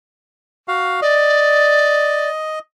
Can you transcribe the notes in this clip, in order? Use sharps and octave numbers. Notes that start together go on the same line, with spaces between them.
F#4 F5
D5 D#5